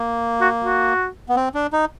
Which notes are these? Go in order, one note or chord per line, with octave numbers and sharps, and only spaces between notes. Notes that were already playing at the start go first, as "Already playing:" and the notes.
Already playing: A#3
F#4
F#4
B3
C4
D4
D#4